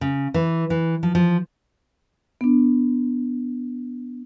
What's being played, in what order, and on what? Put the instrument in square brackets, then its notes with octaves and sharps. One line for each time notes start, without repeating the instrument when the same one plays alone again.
[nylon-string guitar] C#3
E3
E3
F3
F3
[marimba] B3 D4